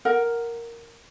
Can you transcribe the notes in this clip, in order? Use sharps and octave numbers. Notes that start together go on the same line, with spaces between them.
A#4 F#5